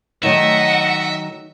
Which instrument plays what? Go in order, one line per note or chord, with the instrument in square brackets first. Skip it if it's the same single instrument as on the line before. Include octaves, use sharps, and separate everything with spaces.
[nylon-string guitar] D#3 F#3 A3 [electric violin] D#5 F#5 [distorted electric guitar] E5